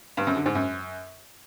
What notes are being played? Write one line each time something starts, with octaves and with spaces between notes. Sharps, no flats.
G2
F#2
D3
G#2
F#2